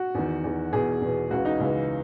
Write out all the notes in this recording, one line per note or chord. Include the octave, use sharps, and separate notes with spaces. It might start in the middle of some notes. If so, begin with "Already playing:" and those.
Already playing: F#4
E2 D#3
E2 D#3
E2 B2 G#4
E2 B2
C#2 C#3 E3 F#4
D#4
C#2 C#3 E3